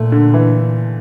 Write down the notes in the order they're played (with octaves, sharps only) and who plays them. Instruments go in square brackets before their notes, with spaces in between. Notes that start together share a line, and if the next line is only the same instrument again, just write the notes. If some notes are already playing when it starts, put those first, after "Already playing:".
Already playing: [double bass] A#2 [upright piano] A3
[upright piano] D3
E3